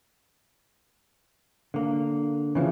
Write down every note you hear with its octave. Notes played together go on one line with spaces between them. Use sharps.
D3 A#3
C#3 E3 F3